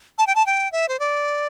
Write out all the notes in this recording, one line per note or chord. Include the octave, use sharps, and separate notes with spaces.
A5
G5
A5
G5
E5
C5
D5